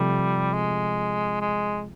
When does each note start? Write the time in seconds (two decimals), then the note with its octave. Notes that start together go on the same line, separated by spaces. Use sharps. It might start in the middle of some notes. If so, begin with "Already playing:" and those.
Already playing: C3 F3 G3 A3
0.54 G#3
1.41 G#3